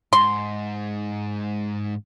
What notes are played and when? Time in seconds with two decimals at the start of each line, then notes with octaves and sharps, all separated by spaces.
0.13 G#2 C6